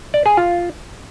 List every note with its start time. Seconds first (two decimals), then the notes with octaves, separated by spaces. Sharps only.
0.14 D5
0.26 G#4
0.37 F4